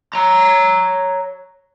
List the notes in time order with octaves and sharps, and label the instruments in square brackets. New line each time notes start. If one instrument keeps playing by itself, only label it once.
[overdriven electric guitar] C#5 A#5